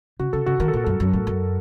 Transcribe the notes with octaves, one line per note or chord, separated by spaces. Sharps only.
C#3 F#4
C#3 A4
C#3 F#4
D#3 A#4
A4
A#2 F#4
F#2 A4
F#2
A2
F#2